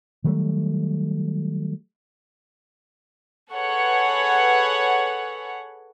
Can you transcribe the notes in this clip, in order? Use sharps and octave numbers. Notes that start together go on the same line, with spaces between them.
D#3 F#3 G3 A3
G#4 A4 B4 C#5 F#5